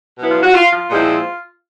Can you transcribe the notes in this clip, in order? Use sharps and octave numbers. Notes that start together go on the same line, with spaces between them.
B2 F#3 B3 E4
F4
F#4
F4
F4
A#2 F3 G#3 C4 E4